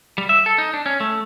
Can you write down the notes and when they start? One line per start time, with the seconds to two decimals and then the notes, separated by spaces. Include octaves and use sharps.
0.18 G3
0.29 E5
0.46 A4
0.58 D#4
0.74 D4
0.86 C#4
1.00 A3